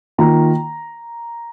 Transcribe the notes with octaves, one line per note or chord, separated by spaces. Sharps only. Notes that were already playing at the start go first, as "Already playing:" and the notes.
D#3 A#3 F4 A#5